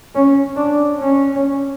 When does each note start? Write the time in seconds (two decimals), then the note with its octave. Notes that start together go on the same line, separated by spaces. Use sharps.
0.15 C#4
0.56 D4
0.99 C#4